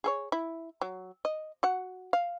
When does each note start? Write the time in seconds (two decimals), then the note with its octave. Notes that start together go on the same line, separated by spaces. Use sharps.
0.04 G#4 A4 C#5
0.32 E4
0.81 F#3
1.25 D#5
1.63 F#4 F#5
2.13 F5